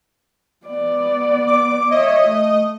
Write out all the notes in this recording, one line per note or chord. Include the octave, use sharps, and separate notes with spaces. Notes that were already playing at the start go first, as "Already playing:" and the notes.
B3 D5
D6
C#5 D#5 E5
A3